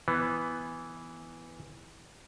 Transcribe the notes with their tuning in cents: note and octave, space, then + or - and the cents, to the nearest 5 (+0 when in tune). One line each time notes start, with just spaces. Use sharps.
E3 +0 B3 +0